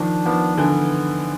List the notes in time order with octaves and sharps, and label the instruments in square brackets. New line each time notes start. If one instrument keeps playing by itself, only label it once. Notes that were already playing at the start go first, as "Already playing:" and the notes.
Already playing: [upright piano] D#3 F3 [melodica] D4
[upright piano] D#3 F3 [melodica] B3
[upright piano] D3 E3 [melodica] B3